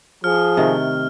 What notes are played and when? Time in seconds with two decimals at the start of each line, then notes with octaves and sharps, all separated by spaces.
0.24 F3 G#4 F6
0.57 C3 D#3 A3